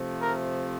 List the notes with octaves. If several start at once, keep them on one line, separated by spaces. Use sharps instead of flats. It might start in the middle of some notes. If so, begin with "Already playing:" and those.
Already playing: C3 F3 A3
A#4